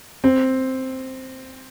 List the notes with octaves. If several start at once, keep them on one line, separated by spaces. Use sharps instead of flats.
C4